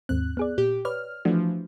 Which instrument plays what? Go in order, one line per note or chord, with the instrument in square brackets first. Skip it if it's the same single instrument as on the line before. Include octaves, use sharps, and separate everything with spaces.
[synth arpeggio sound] D#2 G#2 C4 [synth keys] F#6
[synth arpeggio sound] B3 G#4 D5
[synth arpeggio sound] A#2 [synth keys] G4
[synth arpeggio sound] B4 C#5 D5 [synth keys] F6
[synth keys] E3 F3 [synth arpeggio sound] A3 D4 F#4